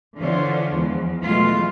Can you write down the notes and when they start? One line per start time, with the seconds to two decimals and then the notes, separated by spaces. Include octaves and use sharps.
0.18 D3 E3 D4 F4 C5 C#5
0.72 E2 F3 G#3
1.23 B2 E3 F#3 G#3 A3 F4